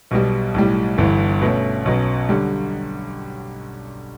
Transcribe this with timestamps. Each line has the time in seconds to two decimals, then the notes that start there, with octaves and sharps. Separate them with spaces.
0.11 B1 B2 G3
0.54 B1 A2 G3
0.98 G1 G2 E3
1.42 B2 A3 C#4
1.85 B1 B2 F#3 C#4
2.29 D3 G3